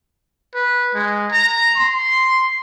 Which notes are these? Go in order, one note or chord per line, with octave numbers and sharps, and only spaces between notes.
B4
G#3
A#5
C6